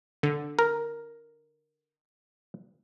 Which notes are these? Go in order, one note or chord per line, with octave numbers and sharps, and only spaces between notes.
D3
A#4